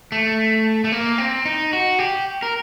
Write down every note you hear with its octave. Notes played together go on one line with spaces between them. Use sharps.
A3
A3
A#3
C4
D#4
F#4
G4
A#4